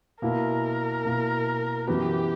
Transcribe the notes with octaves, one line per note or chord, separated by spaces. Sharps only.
B2 A#3 E4 A#4
B2 A#3 E4
F#2 E3 B3 F#4 G4